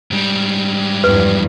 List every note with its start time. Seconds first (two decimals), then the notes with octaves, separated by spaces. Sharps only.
0.11 G#2 G3
1.04 E2 G2 F3 B4